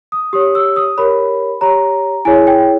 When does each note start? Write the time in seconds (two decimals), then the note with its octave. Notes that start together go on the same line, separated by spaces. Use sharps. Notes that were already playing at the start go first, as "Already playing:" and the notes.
0.12 D#6
0.33 G4 C#5 D#6
0.55 E6
0.76 D#6
0.98 G4 A#4 C#5 B5
1.61 G4 C#5 A#5
2.25 E4 G#4 C#5 G#5
2.47 G5